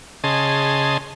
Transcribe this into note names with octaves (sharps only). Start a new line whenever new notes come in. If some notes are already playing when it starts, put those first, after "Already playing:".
C#3 G#4 D#5 A5 C6